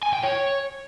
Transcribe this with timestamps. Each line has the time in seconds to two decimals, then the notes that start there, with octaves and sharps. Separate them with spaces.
0.03 G#5
0.13 G5
0.23 C#5